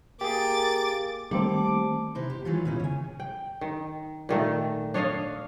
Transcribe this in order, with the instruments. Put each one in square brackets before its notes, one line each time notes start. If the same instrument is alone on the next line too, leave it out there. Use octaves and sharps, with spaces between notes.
[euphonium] A#3 [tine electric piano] G4 G#4 [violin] D6 A6
[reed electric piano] D#3 A#3 C4 [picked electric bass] G3 [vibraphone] A3 C5 A5 [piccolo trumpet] D6
[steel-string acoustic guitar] C3 D#4 E4 C5
G4
E3 F#3 G#3 D#4 F4
A#2 A#3 C#4 D#4 E4
C#3 G#5
[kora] G5
D#3
A#2 D#3 A3
D4 C#5 D#5 F5